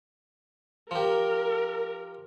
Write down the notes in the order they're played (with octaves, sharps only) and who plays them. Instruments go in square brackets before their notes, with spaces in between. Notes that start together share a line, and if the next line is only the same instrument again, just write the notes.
[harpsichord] F3 G4 [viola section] A#4